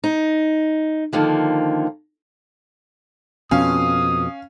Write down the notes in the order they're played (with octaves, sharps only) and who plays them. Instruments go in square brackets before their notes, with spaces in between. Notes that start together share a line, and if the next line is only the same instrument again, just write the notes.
[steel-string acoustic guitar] D#4
D3 D#3 F3 A#3
[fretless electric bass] F2 B2 [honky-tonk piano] C#4 F5 [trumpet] D#6